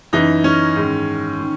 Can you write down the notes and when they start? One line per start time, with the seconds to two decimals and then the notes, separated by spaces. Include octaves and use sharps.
0.13 F#2 E3 D#4
0.44 C#4
0.76 G#2 D#3
1.41 D#3